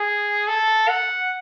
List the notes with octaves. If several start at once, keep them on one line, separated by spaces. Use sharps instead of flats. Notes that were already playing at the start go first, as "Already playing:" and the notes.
Already playing: G#4
A4
F#5